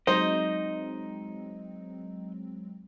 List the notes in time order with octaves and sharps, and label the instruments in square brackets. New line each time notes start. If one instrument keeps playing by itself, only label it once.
[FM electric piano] F#3 G#3 C4 [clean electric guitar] D#4 D#5 [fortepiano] C5